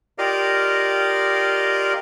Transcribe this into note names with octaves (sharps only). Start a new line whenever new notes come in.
F4 G4 A#4 D5 D#5 F5